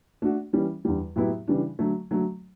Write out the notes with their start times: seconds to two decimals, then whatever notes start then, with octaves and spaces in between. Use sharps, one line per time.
0.22 A3 D4 F#4
0.53 E3 G3 C#4
0.85 E2 D3 G3
1.16 A2 F#3 B3 E4 G4
1.48 C#3 E3 G3 D4
1.79 D3 F#3 A3
2.11 D3 F#3 A3